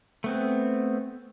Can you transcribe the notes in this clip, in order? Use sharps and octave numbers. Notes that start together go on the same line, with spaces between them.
A3 B3 C4